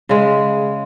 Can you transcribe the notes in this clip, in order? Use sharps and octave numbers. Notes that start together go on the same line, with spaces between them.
C#3 G#3